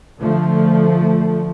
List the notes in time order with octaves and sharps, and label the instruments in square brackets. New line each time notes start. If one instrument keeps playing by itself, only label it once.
[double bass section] D3 F3 A3